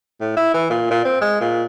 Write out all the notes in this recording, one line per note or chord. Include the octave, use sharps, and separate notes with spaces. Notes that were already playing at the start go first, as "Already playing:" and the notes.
A2
E4
E3
A#2
A#2
C4
G#3
A#2